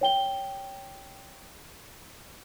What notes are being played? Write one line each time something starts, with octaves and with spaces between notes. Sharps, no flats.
C#5 G5 G7